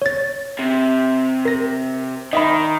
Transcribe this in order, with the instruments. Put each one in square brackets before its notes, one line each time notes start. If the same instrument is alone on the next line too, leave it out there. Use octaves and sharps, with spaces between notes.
[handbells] C#5 A6
[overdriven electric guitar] C3
[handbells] A#4 A#6
[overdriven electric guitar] D#3 [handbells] D#5 E5 B5